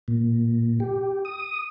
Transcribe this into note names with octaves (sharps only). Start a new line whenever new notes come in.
A#2
G4
D#6